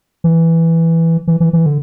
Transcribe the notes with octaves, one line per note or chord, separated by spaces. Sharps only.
E3
E3
E3
E3
D3